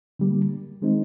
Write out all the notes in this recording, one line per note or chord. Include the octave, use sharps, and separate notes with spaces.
D3 G3 A#3
D#3 G#3 C4 D#4